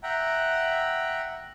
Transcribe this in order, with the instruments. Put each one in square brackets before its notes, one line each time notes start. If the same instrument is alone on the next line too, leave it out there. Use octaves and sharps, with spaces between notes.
[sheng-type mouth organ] E5 F#5 G5 A#5